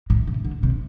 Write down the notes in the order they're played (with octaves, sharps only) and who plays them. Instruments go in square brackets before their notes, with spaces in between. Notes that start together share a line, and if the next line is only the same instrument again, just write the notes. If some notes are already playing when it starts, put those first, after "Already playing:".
[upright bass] A2
C3
D3
C3